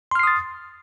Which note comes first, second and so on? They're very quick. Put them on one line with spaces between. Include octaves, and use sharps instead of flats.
C6 F6 C7 D#6 A6